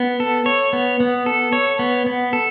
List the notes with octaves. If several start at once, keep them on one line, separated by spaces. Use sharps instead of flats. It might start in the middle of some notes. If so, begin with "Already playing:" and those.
Already playing: B3
A4
C#5
B3
B3
A4
C#5
B3
B3
A4